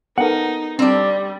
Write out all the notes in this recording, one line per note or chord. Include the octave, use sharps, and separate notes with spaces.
B3 D#4 A4 A#4 F#5
G3 C4 D4 D5